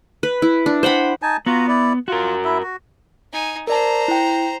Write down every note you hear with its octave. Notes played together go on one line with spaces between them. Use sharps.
B4
E4
D4
C5 F#5 G5 B5
D#4 G#5 A5
B3 F4 F#4 A#5
E4 D5
F4 F#4 A#4
E4 E5
F#4
D#4 G#5
A#4 C5 D5 A5 A#5
E4 G5